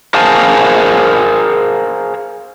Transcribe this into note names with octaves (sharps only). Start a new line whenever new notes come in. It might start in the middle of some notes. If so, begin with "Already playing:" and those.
G#4 A#4 C5 F5 G#5 A5